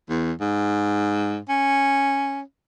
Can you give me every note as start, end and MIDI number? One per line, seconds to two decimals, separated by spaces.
0.09 0.32 40
0.41 1.38 44
1.49 2.41 61